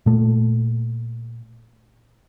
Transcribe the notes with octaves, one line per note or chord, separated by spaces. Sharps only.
A#2 A3